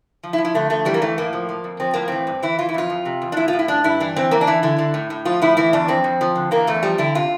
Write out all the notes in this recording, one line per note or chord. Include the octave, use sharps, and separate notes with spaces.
F3
E4
F3
E4
D3 A3
F3 A3
E3 G3
A#3
E3 A3
A2 A#3
F3
F3
F2
F3 C4
A2 A#3
E3 C4
G2
E3 E4
E3 F4
E4
F2 F4
F2
C3
E2
D4
A2 E4
F4
A2
E4
G2 D4
G2 E4
E3 D4
E3 C4
E3 A#3
D4
E3 E4
D3 E4
D3
A2
A2
F3 F4
A2 E4
E3 E4
E2 D4
F2 C4
F2
F3
D3
E3 A#3
E2 A3
F3 G3
D3 E4
C3 F4